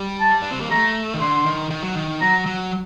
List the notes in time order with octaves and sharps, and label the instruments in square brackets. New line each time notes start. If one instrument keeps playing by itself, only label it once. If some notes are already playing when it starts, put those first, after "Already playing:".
Already playing: [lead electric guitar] G3
[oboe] A5
[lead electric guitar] D4
C4
A#3
[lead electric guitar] A3 [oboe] A#5
[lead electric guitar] D#3
[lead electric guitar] D3 [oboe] C6
[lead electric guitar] D#3
D#3
F#3
D#3
[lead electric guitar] F#3 [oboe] A#5
[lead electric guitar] F#3